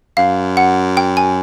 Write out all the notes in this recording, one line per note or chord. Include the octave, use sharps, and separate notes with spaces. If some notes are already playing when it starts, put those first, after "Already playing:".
F#2 F5
F#5
G5
G#5